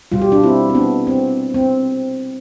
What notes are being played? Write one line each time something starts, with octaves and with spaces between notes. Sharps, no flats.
B2 G3 F4
G4
D4 F4
C4 E4
C4
B3 D4
C4
C4